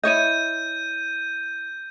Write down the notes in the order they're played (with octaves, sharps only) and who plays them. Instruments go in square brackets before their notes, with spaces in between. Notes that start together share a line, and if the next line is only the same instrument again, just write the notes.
[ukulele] E4 C#5 D#5 [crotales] G6 D#7